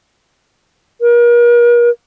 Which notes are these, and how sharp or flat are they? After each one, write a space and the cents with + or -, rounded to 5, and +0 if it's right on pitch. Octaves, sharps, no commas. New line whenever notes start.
A#4 +40